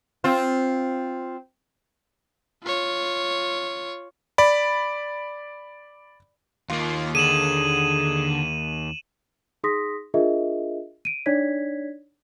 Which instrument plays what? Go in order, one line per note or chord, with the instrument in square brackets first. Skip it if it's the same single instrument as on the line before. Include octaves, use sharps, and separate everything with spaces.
[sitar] C4 F4
[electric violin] F4 C#5
[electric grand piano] D5 B5
[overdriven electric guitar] D#2 A#3 [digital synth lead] F4
[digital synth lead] D3 [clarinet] G#4 [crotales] D#7 E7 F#7
[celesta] D#4 G#4 C6 D#6 A#6 B6
D4 F4 G#4 A#4 D#5 E5
D7 D#7
D4 D#4 C#5 D5 G#6 B6